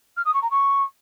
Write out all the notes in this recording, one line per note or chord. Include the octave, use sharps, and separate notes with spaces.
F6
D#6
C#6
A#5
C#6